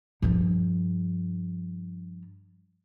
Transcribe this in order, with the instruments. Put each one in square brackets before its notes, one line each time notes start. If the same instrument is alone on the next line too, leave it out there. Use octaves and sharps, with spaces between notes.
[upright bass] G2 F3